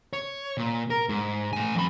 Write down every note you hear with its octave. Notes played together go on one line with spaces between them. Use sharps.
C#5
A#2
A#4
G#2
A2 G#5
F2 B5